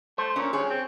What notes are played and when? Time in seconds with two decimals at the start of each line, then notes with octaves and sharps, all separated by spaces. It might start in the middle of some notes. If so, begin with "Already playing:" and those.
0.18 A3 C5
0.36 A#2 C#4
0.53 G2 G#4 C#5
0.70 C4